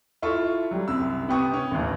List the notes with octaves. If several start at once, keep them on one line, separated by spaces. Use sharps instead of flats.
E4 F4 A4 C#6
F#3 G3
C2 F#2 E6
C3 B3 G4 C#6 D#6
C#4
A1 D#2